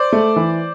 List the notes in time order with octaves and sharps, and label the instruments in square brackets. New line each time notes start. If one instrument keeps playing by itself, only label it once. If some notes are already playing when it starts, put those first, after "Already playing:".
Already playing: [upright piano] C5 D5
[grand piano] A3
E3